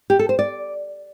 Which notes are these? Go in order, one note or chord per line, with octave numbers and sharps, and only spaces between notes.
G4
A4
C5
D5